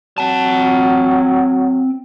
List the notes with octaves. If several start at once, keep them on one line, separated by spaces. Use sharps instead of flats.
F#3 C4 A5